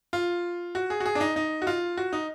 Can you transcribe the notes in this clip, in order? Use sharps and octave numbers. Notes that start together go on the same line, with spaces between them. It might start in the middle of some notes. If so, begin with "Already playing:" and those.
F4
F#4
G#4
F#4
G#4
D4
D#4
D#4
F#4
F4
F#4
D#4